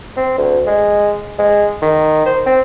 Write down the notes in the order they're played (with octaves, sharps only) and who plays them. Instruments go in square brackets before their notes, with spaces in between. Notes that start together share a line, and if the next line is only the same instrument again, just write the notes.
[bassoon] C4
D2
G#3
G#3
D#3
C5
C4